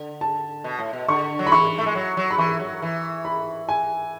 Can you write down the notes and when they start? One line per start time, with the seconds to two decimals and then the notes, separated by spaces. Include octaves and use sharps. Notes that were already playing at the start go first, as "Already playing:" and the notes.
Already playing: D3
0.21 A5
0.64 B2
0.79 A2
0.93 B2
1.08 D3 C#6
1.39 F#3
1.47 B5
1.52 E3 C#6
1.78 A3
1.86 G#3
1.95 F#3
2.17 F#3
2.31 B5
2.38 E3 C#6
2.60 F#3
2.82 E3
3.25 B5
3.69 G#5